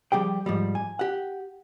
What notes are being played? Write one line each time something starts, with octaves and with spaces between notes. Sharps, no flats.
F3 G3 G4 G#4 G5
G#2 F3 G3
G#5
G4 F#5